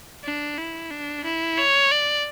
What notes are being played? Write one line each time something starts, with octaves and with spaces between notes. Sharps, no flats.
D4
E4
D4
E4
C#5
D5